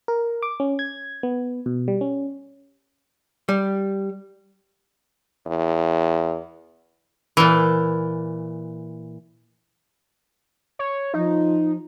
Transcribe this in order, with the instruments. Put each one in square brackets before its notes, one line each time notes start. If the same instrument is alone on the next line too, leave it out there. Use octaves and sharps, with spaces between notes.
[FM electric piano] A#4
D6
C#4
G#6
B3
B2
G3
C#4
[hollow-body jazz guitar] G3
[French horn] E2
[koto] A#2 E3
[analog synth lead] C#5
[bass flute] F3 [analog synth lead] D#4